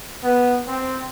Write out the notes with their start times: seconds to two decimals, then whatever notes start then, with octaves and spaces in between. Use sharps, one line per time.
0.23 B3
0.66 C4